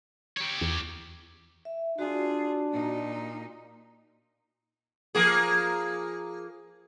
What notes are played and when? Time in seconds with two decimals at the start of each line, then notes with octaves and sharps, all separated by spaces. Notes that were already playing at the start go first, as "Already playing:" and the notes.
0.37 G4 C#5
0.61 E2
1.65 E5
1.99 D4 F4 F#4 G#4
2.72 A#2 D#4
5.15 F3 A#3 G#4